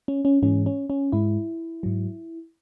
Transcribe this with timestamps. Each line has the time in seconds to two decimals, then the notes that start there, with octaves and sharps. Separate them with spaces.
0.08 C#4
0.25 C#4
0.42 G#2 E3 G#3 C#4
0.66 C#4
0.90 C#4
1.12 G#2 G#3 E4
1.83 G#2 F#3